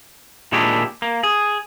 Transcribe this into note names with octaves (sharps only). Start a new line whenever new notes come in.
A#2 D#3 G#3 D4 E4 G4
A#3
G#4